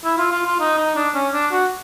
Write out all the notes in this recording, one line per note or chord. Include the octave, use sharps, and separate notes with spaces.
E4
F4
F4
F4
D#4
D#4
D4
C#4
D4
F#4